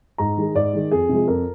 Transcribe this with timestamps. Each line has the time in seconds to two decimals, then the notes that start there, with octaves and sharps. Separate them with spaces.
0.18 G#2 A#5
0.37 D#3 G#3
0.55 G#2 D5
0.73 D#3 G#3
0.91 F2 G#4
1.09 C3 F3 G#3
1.28 F2 A#4